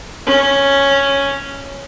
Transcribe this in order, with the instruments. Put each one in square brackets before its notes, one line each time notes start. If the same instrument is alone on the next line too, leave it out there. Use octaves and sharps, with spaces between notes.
[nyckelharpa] C#4